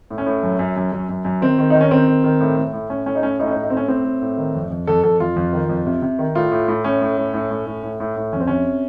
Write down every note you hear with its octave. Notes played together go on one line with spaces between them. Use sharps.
A2
C#4
A2
F#2
F#2
F#2
F#2
F#2
F#2
D#3 C4
D#3
D#3 D#4
C#4
D#3 C4
D#3
D#3
A2
A2
A2
A2 C#4
A2 C#4
D#4
A2 C#4
A2 D#4
C#4
D#4
A2
D#4
A2 C4
C#4
A2 C4
A2
A2
D#3
F2
F2
F2 A4
F2 A4
F2 F4
F2
D#3
F2
C3
C3
D#3
A2 F4
A2
A2
A2 C#4
A2
A2
A2
A2
A2
A2
A2
A2
F2 C#4
C4
C3 C#4